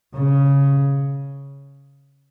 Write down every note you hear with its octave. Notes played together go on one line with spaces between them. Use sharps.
C#3